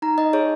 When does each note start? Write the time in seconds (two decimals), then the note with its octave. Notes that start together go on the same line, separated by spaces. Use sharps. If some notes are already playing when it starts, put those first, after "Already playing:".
0.02 D#4 A#5
0.18 D#4 D#5
0.33 G#4 C#5